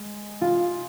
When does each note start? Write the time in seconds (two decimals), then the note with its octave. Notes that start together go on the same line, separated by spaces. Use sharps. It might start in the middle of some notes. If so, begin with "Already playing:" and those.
Already playing: G#3
0.41 F4